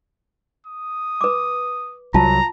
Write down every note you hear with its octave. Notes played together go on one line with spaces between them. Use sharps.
D#6
B4 D6
C2 F#3 F4 A5 A#5